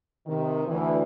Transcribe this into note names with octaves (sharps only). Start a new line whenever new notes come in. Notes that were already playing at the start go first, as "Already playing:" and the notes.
C3 D#3
D2 E3